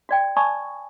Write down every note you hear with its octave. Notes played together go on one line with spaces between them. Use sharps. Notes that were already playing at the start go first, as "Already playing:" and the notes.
F#4 D5 G5
D5 G#5 A5 B5 C#6 D#6